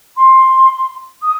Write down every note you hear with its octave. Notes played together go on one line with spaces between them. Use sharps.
C6
D#6